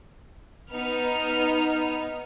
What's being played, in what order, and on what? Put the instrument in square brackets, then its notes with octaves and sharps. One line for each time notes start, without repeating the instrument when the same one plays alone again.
[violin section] B3 D#4 F6